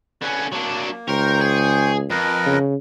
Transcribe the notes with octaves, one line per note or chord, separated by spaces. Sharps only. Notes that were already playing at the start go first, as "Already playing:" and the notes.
D3 C#4 B4
F#3 A#3 D4
C#2 A#4 C5 G5 C#6
G#4
F2 A#4 B4 D#5
C#3